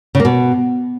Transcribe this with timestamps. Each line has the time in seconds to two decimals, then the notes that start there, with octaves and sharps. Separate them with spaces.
0.15 C#3
0.20 A#3
0.25 B2